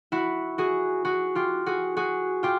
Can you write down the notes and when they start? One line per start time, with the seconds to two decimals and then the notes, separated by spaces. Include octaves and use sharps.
0.12 E4 F#4
0.58 F#4 G#4
1.05 F#4 G#4
1.35 F4 G4
1.66 F#4 G#4
1.97 F#4 G#4
2.43 F4 G4